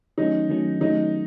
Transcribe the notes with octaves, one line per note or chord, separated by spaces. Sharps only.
D#3 F#3 A3 C#4 D#4
D#3 F#3 A3 C#4
D#3 F#3 A3 C#4 D#4